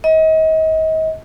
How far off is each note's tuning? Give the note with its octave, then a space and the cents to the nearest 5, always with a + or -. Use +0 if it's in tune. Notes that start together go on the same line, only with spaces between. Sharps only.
D#5 +35